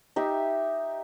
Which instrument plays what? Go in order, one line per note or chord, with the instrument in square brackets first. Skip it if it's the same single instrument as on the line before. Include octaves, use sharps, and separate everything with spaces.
[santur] D#4 G4 E5